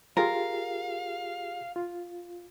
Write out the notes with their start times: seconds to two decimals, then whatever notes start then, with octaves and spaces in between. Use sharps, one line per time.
0.17 F4 G4 G#4 A#4 F5
1.76 F4